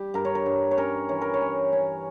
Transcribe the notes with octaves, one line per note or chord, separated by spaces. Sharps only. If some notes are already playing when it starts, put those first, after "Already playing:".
Already playing: G3 G4
G2 A#4
C#5
A#4
G2
C#5
C#4 A#4
E3 C#5
A#4
C#5
C#4
C#4